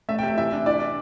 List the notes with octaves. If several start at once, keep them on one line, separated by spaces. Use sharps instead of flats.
A3 E5
G5
C3 E5
E3 E5
D4
E3 D5